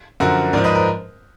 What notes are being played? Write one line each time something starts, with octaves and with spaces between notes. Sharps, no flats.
F#2 D3 F3 F#4 A#4
G#2 F3 A#4 D5
B4 D#5
A#4